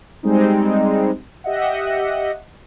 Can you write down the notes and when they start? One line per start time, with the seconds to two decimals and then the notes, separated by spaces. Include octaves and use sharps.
0.23 G3 G#3 C4 D#4
1.44 G4 D#5 E5 F#5